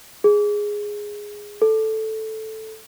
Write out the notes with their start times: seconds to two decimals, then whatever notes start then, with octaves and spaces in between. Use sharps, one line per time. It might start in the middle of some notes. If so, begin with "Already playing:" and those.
0.24 G#4
1.62 A4